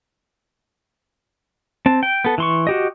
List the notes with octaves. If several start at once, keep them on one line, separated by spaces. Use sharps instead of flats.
C4 A5
G5
B3 A4
E3 C6 C#6
F#4 G4 D#5